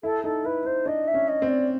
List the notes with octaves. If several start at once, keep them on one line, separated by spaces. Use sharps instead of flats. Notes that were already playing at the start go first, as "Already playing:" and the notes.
E4 A4
D#4 A4
E4 B4
D#4 C5
D4 D#5
E5
C#4
D#5
C4
D5